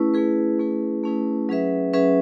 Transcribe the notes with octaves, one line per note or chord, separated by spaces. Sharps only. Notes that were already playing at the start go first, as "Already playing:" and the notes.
Already playing: A3 C#4 E4 G#4 B4
A3 C#4 E4 G#4 B4
A3 C#4 E4 G#4 B4
A3 C#4 E4 G#4 B4
F#3 C#4 G#4 B4 E5
F#3 C#4 G#4 B4 E5